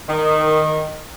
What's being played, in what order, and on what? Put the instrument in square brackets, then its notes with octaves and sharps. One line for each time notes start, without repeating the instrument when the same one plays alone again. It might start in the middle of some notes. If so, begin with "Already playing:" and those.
[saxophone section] D#3